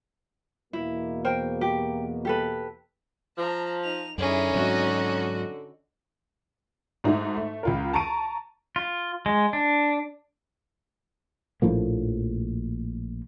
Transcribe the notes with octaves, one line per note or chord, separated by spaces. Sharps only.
E2 B2 A#3 E4
A#4 C5 G5
G4
G4 A4 B4
F3 A5 A#5
D#4 F7
F#2 D3 C#4 D#4 E4 G#4
G#2 F#3 C4 F#4 D#5
G#2 A3 D#4 F#4
A3
C#2 F4 A#4
A5 A#5 C#6 D7 D#7
F4
G#3
D4
A#1 A2 F3 A#3